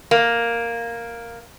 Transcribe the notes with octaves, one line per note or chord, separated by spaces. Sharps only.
A#3